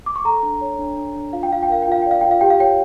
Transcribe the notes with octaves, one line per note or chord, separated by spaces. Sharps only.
D6
C#6
A4 A#5
D4
C#5
D4
D4
D4
F4 F5
G5
F4 F5
G5
A#4 F5
G5
F4 F5
D5 G5
F5
F4 G5
F5
G4 G5
F5
C#5 G5